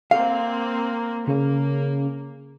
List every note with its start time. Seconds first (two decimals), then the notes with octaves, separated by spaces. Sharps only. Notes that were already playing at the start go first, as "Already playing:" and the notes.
0.11 A#3 C4 F5
1.27 C#3 A#3